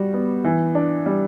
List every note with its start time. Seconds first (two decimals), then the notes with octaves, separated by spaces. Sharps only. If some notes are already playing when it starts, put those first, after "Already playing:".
Already playing: G3 F#4
0.14 B3
0.44 E3
0.75 D4
1.06 G3